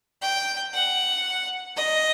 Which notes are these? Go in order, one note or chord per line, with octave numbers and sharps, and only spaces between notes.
G5
F#5
D#5